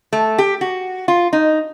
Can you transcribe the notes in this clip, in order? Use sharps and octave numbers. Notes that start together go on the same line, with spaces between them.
A3
G4
F#4
F4
D#4